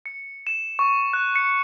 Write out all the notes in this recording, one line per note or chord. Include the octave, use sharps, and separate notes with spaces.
C#7
E7
C#6
F#6
C#7